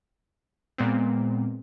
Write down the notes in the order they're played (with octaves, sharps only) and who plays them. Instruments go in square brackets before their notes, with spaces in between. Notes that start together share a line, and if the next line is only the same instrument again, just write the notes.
[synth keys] A#2 G#3 B3 C4